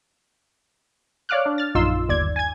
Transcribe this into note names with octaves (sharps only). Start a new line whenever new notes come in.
C#5 D5 F5 D6 F6 F#6
D4
F6 A6
A#1 F#2 D#4 F4 C6 E6
G1 D#2 D5 G#6
G#5 G#6